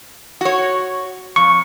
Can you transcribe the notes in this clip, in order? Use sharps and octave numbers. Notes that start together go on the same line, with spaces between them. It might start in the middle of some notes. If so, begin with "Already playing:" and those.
F#4 C#5
F2 C#6